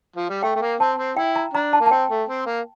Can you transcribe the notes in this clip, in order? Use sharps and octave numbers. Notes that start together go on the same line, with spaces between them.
F3
G3
A3 G5
A3
A#3
C4 A5
C4
E4 G5
A#5
D4 A#5
A5
A#3
A5
C4 G5
A3
C4
A#3